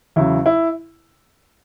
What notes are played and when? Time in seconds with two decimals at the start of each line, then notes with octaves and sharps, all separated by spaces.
0.16 E2 C#3 F#3 E4
0.46 E4